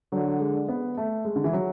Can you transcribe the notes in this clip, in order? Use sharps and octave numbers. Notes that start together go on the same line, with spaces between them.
D3 F#3
G#3
B3
A3
G#3
D3
E3
F#3